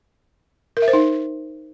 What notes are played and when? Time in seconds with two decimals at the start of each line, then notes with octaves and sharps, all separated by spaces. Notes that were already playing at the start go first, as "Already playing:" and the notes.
0.77 A#4
0.82 E5
0.88 C5
0.93 D#4